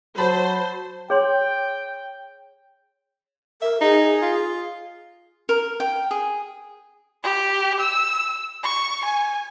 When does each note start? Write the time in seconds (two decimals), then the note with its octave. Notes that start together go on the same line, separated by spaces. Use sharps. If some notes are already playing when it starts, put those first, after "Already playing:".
0.18 F#3 C5 A5 B5
1.10 G#4 C#5 G5 C6
3.62 A#4 E5
3.81 D#4 G#4
4.22 F4
5.49 A#4
5.80 G5
6.11 G#4
7.23 G4
7.80 E6
8.63 C#6
9.04 G#5